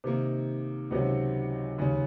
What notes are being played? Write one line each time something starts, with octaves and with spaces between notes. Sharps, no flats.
C3 D#3 A#3 D#4
C#2 C3 D#3 F#3 C#4
D#2 C#3 G#3 C#4